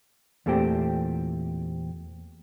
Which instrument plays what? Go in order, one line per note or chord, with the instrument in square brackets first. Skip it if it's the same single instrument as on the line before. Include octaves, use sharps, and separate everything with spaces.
[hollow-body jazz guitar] E2 A#2 A3 C4 G4